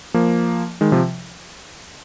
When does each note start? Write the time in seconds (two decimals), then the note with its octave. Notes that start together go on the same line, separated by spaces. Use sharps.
0.14 F3 A#3
0.81 D#3 G#3
0.92 C3 F3